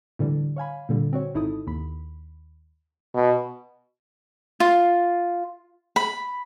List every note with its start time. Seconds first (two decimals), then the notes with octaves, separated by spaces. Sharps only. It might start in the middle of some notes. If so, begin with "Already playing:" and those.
0.19 A2 D3 E3 G3
0.56 C#5 F5 G#5 B5
0.89 A#2 D3 G3
1.13 C4 F#4 C#5
1.35 G#1 D#4 E4 A4 D#6
1.67 D#2 B5
3.15 B2
4.60 F4
5.96 B5